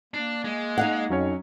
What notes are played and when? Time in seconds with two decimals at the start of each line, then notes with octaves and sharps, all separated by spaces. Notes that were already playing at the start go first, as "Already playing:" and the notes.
0.14 A#3 D4
0.44 G#3
0.78 D#4 F5 F#5
1.10 F2 F#3 C#4 C#5